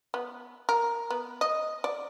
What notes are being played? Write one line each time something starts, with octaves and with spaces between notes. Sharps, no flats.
B3
A#4
B3
D#5
D5